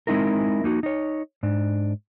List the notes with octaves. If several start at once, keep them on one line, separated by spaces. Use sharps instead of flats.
G#3 C4 D#4 E4 A#4
A#3 D#4 F#4
D#4 C#5
G#2 D4